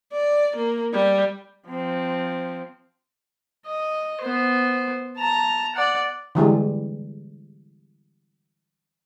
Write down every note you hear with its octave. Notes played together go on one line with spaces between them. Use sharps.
D5
A#3
G3
F3 C4
D#5
B3 C5
A5 A#5
D5 F#5
D3 E3 G3 G#3